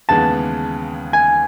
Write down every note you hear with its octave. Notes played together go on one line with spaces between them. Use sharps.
D#2 C#3 E3 G#3 B3 A5
G#5